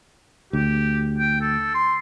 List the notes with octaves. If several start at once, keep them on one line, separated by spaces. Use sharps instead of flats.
D2 G4
G5
A4
C6